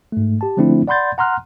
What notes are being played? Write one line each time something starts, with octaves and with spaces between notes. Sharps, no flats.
G#2 A3
G4 A5
D3 F3 A3 C4 D4 E4
D5 F#5 B5 C6 G6 A6
F#5 A#5 C6 F6 F#6